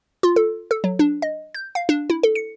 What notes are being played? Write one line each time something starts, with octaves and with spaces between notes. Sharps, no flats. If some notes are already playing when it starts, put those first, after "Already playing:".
F4
A4
A4
F#3
D4
D#5
G6
F5
D4
E4
A4
C#7